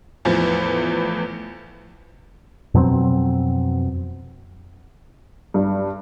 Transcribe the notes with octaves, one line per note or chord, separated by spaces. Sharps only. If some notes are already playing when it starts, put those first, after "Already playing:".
E2 A2 F3
F2 B2 F#3 C4
G2